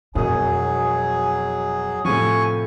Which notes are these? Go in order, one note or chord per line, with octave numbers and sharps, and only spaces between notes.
E1 F2 B2 F#3 G#4 G#5 D#6
A2 C3 F3 G#5 C#6